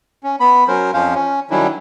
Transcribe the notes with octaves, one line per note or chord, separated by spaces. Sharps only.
C#4
B3 B5
F#3 C#4 A#4 C5
F2 F3 C#4 C5 F5
C#4
D#3 F#3 G3 C#4 D4 E4